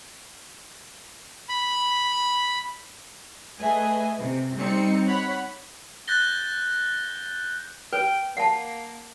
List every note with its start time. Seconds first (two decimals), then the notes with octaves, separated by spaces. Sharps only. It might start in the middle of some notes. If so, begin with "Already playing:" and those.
1.49 B5
3.60 A3 G#4 B4 D#5 E5 G#5
4.18 C3
4.56 G3 C4 D#4 C#7
5.05 C#5 F#5 B5
6.08 F#6 G6 A6 A#6 G7
7.93 B4 G5
8.37 A#3 F#5 A5